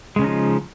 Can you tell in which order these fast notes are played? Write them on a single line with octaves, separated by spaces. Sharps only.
G#3 C#3 C#4 D#4 F3